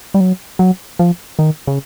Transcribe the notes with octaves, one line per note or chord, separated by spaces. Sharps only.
G3
F#3
F#3
F3
D#3
C#3